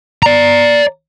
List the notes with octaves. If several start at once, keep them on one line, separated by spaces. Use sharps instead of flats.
D5 A#5